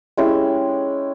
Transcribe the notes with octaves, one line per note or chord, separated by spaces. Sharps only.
G#3 C#4 E4 G4